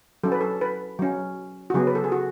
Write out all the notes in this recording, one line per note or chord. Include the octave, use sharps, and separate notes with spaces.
F#3 C#4 A4
B4
A4
B4
F#3 C#4
F#4
C#3 F#3 B3 G#4
B4
A4
G#4
F#4